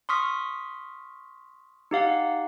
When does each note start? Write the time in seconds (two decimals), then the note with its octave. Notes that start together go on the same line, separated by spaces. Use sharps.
0.09 C6 C#6 D#6 F6 B6
1.91 D#4 G4 F5 F#5